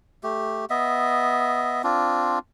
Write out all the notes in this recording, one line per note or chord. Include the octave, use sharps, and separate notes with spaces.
A3 G4
B3 D#5 E5
C4 D4 F4